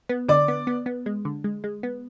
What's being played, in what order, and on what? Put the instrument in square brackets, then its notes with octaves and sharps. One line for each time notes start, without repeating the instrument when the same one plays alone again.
[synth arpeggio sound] B3
[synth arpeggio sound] D3 [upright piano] D5 D6
[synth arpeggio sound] B3
B3
B3
G#3
D3
G#3
G#3
B3